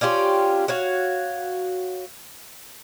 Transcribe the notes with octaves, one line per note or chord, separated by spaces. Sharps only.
C#4 D4 F4 G4
F#4 C#5 F5